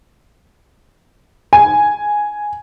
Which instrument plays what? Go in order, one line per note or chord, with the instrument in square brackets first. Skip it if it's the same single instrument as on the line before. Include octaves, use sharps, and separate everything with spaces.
[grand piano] G#5